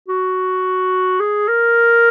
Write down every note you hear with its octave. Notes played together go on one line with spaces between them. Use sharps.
F#4
G#4
A#4